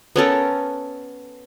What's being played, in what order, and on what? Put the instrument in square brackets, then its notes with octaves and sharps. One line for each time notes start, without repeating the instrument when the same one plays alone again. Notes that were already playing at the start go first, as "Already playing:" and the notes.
[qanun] B3 C#4 A4 A#4